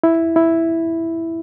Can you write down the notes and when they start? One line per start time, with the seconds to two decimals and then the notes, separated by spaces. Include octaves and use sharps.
0.04 E4
0.36 E4